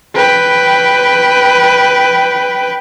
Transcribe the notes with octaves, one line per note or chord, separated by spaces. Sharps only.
B4 G5